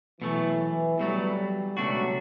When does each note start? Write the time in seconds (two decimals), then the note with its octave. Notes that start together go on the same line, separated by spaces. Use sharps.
0.21 B1 B2 E3 F#3 A3
0.99 B1 B2 F#3 G3 A3
1.76 C#2 B2 F#3 A3 D4 F#4